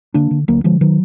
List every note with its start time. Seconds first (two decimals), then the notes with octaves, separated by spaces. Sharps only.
0.14 D3 A#3 D4
0.31 D3
0.48 D2 F#3 A#3
0.64 D3 F3 G#3
0.81 D#3 F#3